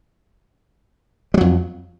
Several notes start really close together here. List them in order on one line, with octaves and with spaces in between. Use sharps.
G3 F#3 F2